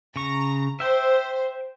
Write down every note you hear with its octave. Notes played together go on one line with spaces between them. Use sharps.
C#3 A#5 C#6 A#6
C5 E5 G5